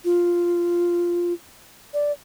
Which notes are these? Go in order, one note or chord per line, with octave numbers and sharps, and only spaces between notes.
F4
D5